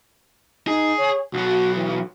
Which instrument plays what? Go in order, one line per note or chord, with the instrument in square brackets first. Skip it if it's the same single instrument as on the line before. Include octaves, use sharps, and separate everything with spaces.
[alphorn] D#4 [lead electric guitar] G#4
[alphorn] C#5
[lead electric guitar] B1 F#3 [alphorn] F#4
[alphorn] E3